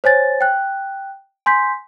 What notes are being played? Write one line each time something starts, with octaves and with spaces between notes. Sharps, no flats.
C5 C#5 G#5 A6
G5 F#6
G#5 C6 G6 B6